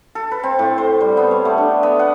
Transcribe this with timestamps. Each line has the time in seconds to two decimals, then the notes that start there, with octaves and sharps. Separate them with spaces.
0.15 A4
0.32 B4
0.44 C4
0.59 A2
0.78 C5
1.01 G3
1.17 B3
1.31 C#5
1.45 A3
1.58 D4
1.83 B3
1.99 F#5